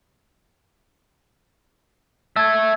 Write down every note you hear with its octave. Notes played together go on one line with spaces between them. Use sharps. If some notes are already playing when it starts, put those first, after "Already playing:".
E5 A5 E6 G#6